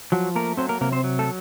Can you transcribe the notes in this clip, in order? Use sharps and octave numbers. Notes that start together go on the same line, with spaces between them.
F3 F#3 F#4
A3 A#3 A#4
F#3 C4 C5
A#3 A#4
C3 A#3 A#4
C4 C5
F#3
A3 A4